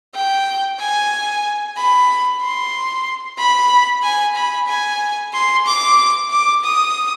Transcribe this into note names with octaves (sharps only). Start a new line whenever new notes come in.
G5
G#5
B5
C6
B5
G#5
B5
G#5
C6
D6
D6
D#6